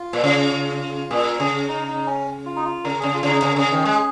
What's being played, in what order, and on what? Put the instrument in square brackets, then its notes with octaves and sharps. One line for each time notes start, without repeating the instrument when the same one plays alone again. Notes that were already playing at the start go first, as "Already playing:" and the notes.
Already playing: [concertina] F4
[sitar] A#2
C#3
[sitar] A#2 [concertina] G#4
[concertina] A#4
[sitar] C#3 [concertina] G#4
[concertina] D#4
D#4
C#4
F4
D#4
F4
[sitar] C#3 [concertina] A#4
[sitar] C#3 [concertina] G#4
[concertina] F4
[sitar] C#3
[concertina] D#4
[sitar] C#3 [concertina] G#4
[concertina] A#4
[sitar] C#3 [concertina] G#4
[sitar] D#3
G#3